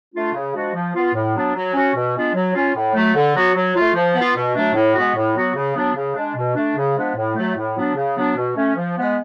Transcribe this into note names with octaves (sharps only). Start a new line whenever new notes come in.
A3 D4 F4
C#3
F3 G#3 D4 F#4
F3
B3 F4
A2
F#3 B3 D4
F#3
C#4 F#4
B2
G#3 B3 D4 F4
F#3
C#4 F4
A2
F#3 A3
D3
F#3 B3 F#4
F#3
A3 F4
F3
B3 F4
B2
F#3 A3 D4
A2
G#3 B3 F#4
A2
F#3 B3 F#4
C#3
F#3 B3 D4
C#3
G#3 D4
B2
A3 D4
C#3
F3 G#3 B3 D4
A2
F#3 A3
A2
F#3 B3 D4
C#3
F#3 B3 D4
B2
A3 C#4
F3
G#3 B3